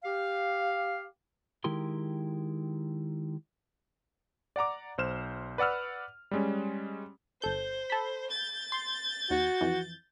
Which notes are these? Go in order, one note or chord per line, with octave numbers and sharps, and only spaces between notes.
G4 F5
D#3 G#3 E4 G4 A#4 C6
D5 F#5 A#5 D6
B1 C5 F6 E7
B4 D5 F#5 E6 F6
G3 G#3 C#4
G1 A4 C5 G6
A4 B5
G6 A6
C6
D#2 F#4
F2 E3